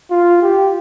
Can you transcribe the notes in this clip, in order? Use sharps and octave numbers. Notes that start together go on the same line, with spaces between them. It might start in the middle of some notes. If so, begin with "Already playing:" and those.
F4
G4